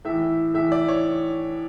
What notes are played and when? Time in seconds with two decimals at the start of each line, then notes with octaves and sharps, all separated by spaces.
0.05 A2 E3 E5
0.54 A2 E3 E5
0.72 D5
0.88 C#5